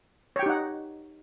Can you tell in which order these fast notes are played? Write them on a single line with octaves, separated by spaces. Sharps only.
C#5 G5 G4 D#4 F#5